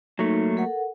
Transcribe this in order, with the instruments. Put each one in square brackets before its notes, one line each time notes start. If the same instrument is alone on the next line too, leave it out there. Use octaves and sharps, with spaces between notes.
[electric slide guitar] F#3 A3 [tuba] A#3 [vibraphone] D#4
[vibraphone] A4 A#4 F#5